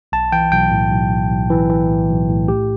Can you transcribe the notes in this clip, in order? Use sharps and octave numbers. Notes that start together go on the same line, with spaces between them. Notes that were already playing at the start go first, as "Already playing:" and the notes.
B1 A5
E3 G5
B1 G5
A2
B1
B1
B1
E3
E3
A2
B1
A2
A3 G4